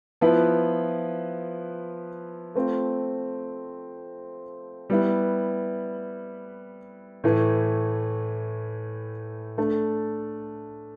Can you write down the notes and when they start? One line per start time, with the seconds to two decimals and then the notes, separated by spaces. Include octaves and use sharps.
0.21 F3 B3 E4 B4
2.55 A3 C4 F4
4.90 G3 B3 E4 B4
7.24 A2 E3 A3
9.58 A3 D4 A4